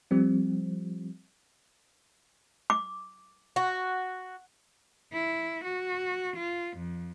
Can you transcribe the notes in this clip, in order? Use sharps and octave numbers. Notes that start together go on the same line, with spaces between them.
F3 G3 C4
D6
F#4
E4
F#4
F4
F2